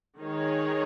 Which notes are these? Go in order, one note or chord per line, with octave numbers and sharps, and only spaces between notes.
D#3 G#3 D#4 G#4 C#5